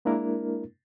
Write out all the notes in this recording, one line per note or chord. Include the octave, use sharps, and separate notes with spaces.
G#3 A#3 D4 E4 A#4